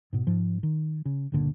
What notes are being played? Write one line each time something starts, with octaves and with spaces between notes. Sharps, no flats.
G#2 B2
G#2 F3
D#3
C#3
G1 C#2 A#2 D3